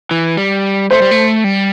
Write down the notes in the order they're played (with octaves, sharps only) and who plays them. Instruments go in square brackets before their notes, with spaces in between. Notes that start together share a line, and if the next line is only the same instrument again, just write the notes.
[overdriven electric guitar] E3
G3
[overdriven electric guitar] A3 [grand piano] C5
[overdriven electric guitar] G3
A3
G3